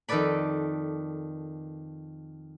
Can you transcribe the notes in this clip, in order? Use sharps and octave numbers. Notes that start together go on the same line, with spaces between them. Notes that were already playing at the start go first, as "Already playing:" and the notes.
F2 D#3 A4 B4 D5 B5